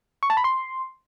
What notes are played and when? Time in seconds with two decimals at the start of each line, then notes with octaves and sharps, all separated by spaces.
0.23 C#6
0.30 A5
0.37 B5
0.44 C6